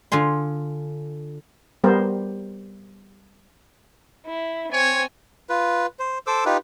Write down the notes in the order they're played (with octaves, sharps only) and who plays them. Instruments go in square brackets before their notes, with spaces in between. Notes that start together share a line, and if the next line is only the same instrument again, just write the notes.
[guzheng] D3 F4 G#5 C6
[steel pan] G3 B3 A#4 C5
[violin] E4
[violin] C4 G#5 [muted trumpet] C#5
[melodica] F4 B4
C5
A4 C5 D6 E6
D#4 F4 G4 B4